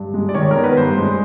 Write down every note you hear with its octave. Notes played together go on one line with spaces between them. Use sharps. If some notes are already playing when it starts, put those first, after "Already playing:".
Already playing: G2
G#3
D5
D#3 C#5
B3 A#4
B4
G2 C5
G#3